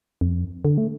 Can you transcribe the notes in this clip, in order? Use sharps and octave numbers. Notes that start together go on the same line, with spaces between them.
F2
D3
A3